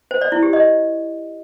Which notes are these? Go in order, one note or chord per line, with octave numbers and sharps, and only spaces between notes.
C5
D5
E4
G4
D#5